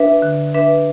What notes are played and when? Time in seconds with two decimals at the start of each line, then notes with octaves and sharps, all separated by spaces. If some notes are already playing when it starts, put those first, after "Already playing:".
Already playing: D4 B4 E5
0.22 D3
0.54 D4 B4 E5